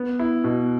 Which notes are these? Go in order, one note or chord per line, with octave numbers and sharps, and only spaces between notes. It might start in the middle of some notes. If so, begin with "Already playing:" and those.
Already playing: B3
E4
B2